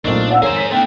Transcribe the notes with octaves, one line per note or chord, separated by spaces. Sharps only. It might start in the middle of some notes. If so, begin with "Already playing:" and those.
B1 A#2 A3 C4 D4 D#4 A#4 C#6
D5 F5 F#5 E6
G#1 F2 D#3 G#4 A#4 C5 C#5
B6
A3 B3 D4 D#4 G5